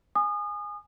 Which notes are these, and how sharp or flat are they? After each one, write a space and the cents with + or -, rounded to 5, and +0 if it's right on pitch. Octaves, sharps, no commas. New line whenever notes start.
G#5 +0 D#6 -35